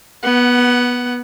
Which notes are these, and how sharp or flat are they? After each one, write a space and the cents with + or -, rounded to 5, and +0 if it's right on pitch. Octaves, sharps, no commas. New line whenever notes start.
B3 -15 F#5 +10